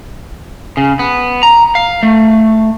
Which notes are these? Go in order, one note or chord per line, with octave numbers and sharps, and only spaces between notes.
C#3
B3
A#5
F5
A3